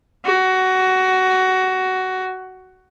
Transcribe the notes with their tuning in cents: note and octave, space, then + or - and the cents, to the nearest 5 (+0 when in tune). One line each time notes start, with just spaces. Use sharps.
F#4 +15